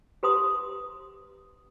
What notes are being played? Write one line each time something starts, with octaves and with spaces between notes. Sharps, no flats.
G4 B4 C6 D#6